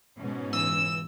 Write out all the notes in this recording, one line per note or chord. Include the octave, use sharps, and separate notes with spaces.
G#2 B2 C#4
C#2 E3 D#6 E6